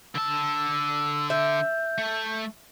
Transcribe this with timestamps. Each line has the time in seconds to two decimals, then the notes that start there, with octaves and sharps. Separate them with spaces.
0.15 D3 A5 E6
1.30 E5 G6
1.98 A3